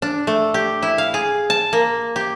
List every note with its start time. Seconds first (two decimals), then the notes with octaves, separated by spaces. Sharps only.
0.02 D4
0.27 A3
0.54 G4
0.82 E4
0.98 F5
1.14 G#4
1.50 A5
1.73 A#3
2.16 G4